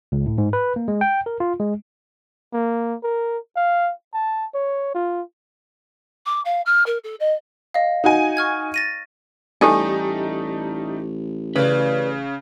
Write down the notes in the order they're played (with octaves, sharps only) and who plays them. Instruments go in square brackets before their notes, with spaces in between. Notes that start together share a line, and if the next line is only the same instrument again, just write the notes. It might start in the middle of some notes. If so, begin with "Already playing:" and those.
[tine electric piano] C#2
A2
G#2
B4
A#3
G#3
G5
A#4
F4
G#3
[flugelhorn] A#3
A#4
F5
A5
C#5
F4
[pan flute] D6
F5
F6
A#4
A4
D#5
[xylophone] D#5 F5
[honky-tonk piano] D#4 F#4 G#5
[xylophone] C#6 F6 G#6
A6 A#6 D#7
[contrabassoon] A1 [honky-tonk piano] G3 A3 D#4 [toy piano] G4 A4 G#5
[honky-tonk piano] C#3 [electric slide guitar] B4 D5